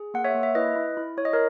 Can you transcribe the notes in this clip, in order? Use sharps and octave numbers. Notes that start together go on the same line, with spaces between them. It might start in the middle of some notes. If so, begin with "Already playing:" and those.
Already playing: G#4
A#3 F#5
C#5 E5
A#3
E5
E4 B4 D#5
E4
E4
E4 C#5
D#5
A#4 C#5